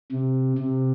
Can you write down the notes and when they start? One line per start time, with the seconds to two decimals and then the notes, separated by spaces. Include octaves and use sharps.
0.12 C3
0.58 C3